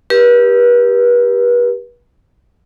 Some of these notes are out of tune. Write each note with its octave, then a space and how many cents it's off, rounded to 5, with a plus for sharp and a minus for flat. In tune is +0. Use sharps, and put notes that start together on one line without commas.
G4 +0 B4 -40